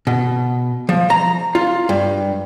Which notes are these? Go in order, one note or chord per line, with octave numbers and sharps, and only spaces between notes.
B2
F3
A#5
F4
G2